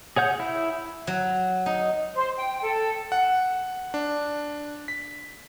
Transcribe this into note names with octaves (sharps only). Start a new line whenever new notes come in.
G#4 C#5 F#5 G6
E4
F#3
D#4
C5
G5
A4
F#5
D4
B6